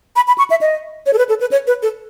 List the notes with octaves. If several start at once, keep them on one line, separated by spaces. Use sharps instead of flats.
B5
B5
C#6
E5
D#5
C#5
A4
B4
A4
B4
C#5
B4
A4